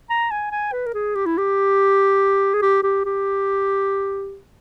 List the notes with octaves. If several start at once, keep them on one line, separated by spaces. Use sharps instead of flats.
A#5
G#5
G#5
B4
A#4
G#4
G4
E4
G4
G#4
G4
G4
G4